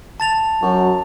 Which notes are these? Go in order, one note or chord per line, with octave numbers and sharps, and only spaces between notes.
A5 A6 F7
F#2 F#3